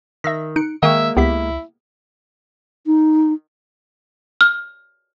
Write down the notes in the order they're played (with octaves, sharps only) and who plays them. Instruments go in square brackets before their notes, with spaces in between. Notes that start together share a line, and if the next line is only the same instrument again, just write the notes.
[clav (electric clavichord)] D#3 [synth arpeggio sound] E5 E6 A#6
[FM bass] D#4 [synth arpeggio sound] F#6 C#7 D7
[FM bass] D#3 [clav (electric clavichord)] G#3 A#3 A#4 [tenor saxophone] E5 [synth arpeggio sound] F5 G5 C#6
[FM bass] C#2 [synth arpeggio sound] B3 G4 B6 [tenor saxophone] E4
[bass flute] D#4
[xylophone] F6